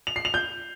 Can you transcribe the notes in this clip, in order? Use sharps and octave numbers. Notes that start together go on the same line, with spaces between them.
F7
C7
F7
G6